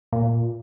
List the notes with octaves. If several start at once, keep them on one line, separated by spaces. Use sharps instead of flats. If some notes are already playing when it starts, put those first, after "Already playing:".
A#2